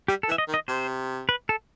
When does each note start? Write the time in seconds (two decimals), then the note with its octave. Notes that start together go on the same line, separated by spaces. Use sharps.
0.08 G3 G4
0.23 A4
0.28 E3
0.32 E5
0.38 D#5
0.48 D#3
0.54 D#5
0.68 C3 C5
1.29 B4
1.49 A4